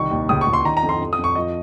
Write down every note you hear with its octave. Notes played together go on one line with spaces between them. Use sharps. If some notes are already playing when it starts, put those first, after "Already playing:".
Already playing: C2 D#3 C#6
D#2
C#2 D#6
C#6
C#2
C6
D#3 A#5
A#5
F2
C6
F2
D#6
F2
C#6
F3 D#5